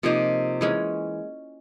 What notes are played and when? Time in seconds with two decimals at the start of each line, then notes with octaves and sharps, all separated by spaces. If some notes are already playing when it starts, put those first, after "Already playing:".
0.03 C3 F3 A#3 D#4
0.61 E3 G#3 C#4